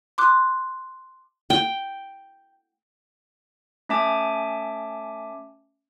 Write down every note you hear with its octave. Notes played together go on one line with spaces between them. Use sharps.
C6 D6 F#6
G5
A3 C#4 E5 G#5 A5 D6